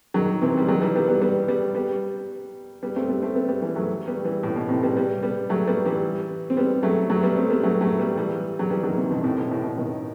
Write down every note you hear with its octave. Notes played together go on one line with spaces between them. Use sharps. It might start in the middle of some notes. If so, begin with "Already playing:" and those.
D#3 F#3
C3 E3
G3
D#3 F#3
E3 G3
G3 B3
G3 B3
G3 B3
G3 B3
G3 B3
G3 B3
A3 C4
G3 B3
A3 C4
G3 B3
G3 B3
E3 G3
F#3 A3
G3 B3
E3 G3
A2
B2
A2 C3
G3 B3
G3 B3
G3 B3
F#3 A3
G3 B3
E3 G3
C4
G3 B3
F#3 A3
F#3 A3
G3 B3
A3 C4
G3 B3
F#3 A3
F#3 A3
G3 B3
E3 G3
F#3
E3 G3
D#3 F#3
C3 E3
B2 D#3
A2 C3
B2
A2
B2
B2 D#3